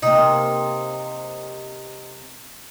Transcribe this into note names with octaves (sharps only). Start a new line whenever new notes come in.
C3 A#3 D#4